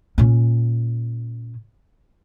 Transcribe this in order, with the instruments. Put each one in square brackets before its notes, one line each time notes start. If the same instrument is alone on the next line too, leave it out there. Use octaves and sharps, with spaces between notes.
[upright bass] A#2 C#4